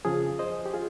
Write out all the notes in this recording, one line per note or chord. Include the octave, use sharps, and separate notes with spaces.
F2 C#3 F3 F4 G#4
C5 D#5
G4
F4 G#4